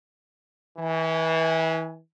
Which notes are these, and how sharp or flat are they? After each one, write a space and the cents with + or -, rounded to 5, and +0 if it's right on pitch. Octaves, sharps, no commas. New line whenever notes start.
E3 -30 G#5 +15